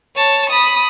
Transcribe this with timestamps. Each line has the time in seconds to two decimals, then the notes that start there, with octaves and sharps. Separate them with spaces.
0.16 C#5 A5
0.50 B5 D#6